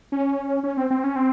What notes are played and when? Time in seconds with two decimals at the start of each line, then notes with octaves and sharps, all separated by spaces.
0.12 C#4
0.64 C#4
0.77 C4
0.90 C4
1.04 C#4
1.16 C4